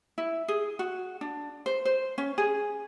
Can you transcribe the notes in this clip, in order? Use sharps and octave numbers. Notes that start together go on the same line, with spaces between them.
E4
G#4
F#4
D4
C5
C5
C#4
G#4